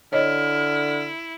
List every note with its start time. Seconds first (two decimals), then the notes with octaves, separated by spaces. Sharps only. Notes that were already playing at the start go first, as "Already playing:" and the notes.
0.13 D3 E4 C#5 D#5 F6